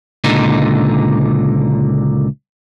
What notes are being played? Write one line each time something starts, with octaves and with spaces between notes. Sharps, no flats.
C#2 A#2 D3 D#4